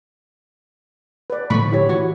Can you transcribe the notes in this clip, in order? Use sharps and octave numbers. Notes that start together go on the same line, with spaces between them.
B4 D5
A2 D3 F3 B5 C#6
E4 G4 C#5
E3 F#4 C#6